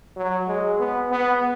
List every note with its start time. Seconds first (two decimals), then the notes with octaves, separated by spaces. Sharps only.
0.16 F#3
0.48 G#3
0.80 B3
1.11 B3